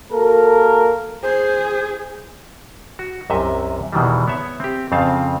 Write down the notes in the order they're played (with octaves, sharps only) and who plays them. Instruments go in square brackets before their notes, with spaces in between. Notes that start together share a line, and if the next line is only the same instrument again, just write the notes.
[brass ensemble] A#3 F#4 A4 A#4
[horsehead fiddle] G#4 [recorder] C5
[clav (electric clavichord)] F#4
C2 F#2 C3 D#5 E5
E2 B2 D#3 E3 G3
B3 C#5 E5
C4 G4
F2 C#3 C4 F4 F5 A5